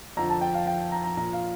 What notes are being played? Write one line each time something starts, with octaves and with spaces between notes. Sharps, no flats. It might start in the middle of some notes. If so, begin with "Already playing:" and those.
F2 D3 F3 A#5
A5
G5
F5
G5
A#5
A#5
A#2 F3 A#5
F5